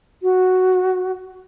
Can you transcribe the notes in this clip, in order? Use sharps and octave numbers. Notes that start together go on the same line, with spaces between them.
F#4